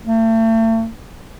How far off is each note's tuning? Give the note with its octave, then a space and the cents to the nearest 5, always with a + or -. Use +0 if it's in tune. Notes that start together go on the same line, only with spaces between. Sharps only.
A3 +40